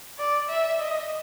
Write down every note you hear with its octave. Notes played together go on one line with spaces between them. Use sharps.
D5
E5
D#5